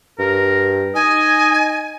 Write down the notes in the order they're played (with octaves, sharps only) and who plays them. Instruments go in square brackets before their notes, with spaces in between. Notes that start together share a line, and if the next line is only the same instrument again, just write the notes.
[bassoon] G2 [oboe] A#4
[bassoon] D#4 [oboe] D#5 [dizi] G#5